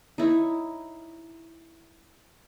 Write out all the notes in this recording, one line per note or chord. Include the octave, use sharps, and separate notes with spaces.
D#4 E4 C#5